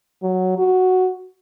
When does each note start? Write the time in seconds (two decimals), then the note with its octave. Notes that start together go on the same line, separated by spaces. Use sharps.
0.23 F#3
0.58 F#4